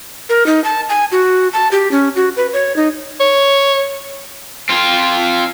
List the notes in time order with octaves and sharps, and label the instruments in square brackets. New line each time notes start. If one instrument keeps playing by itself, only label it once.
[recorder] A#4
D#4
A5
G#5
F#4
A5
G4
C#4
F#4
B4
C#5
D#4
[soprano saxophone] C#5
[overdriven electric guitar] C4 F4